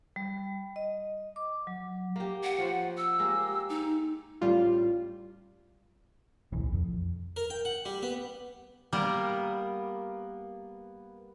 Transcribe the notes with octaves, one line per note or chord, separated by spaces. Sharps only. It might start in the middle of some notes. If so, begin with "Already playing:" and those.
G3
D#5
D6
F#3
A#3 G4
F#5
F3 F#4 C5
E6
G#3 A#3 G4
D#4
A1 G3 F4
D1 B1 E3
F2
A#4
G5
F#5
G3
B3
G3 A#3 B3 A#4